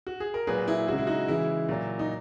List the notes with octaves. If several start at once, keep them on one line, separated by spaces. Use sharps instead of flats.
F#4
G#4
A#4
A#2 F#3 G#4 B4
E4 G#4
C#3 G#3 F#4
E4
D#4 F#4
C#3 E3 G#3 E4
A#2 F#3
D#4